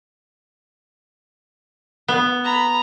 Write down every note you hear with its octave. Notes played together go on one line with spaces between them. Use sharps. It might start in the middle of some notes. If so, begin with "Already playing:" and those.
B3
A#5 B5